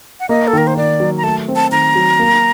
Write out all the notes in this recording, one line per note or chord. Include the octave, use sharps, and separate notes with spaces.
F#5
A#3 D#5
A4
D#3 A#4
C5
D#3 D5
F#3
A#5
A3 A5
C4
A5
D#3 A#5
F#3
A#3